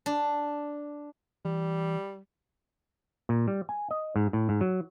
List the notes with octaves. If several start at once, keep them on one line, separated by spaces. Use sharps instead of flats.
D4
E3 G3
A#2
G3
G#5
D#5
G#2
A2
G#2
F#3